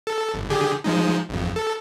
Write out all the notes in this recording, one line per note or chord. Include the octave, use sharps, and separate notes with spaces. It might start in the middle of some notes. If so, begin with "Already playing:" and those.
A4
G1
D3 G4 G#4
F3 G#3 D#4
G#1 F2
A4